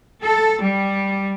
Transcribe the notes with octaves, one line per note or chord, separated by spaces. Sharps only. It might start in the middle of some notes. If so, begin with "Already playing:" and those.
A4
G3